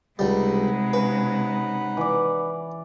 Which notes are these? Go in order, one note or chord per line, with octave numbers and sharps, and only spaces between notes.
C#2 C3 G3 G#3 D#4 F#5 B5
C#3 B4
E3 D5